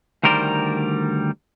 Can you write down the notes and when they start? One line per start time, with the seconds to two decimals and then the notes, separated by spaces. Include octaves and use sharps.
0.23 D2 D#3 G3 A#4 C5 D5